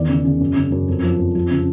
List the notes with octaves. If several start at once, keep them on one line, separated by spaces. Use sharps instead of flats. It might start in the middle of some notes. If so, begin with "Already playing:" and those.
Already playing: E2 D#3 D5
C#3
C#3
F#2
C#3
F#2
F2
F3
F2
F3
C#3